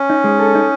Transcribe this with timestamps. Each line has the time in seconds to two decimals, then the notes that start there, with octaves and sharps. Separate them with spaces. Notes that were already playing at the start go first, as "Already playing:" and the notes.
Already playing: C#4
0.10 D#4
0.24 G#3
0.39 A4
0.55 D#4